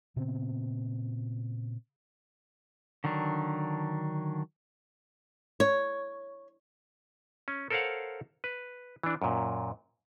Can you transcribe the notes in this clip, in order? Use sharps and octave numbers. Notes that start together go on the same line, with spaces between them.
A#2 C#3 B3 C4
D3 D#3 F#3 D4
C#5
C#4
A4 A#4 C5 C#5 F5 F#5
B4
E3 D4
F#2 A#2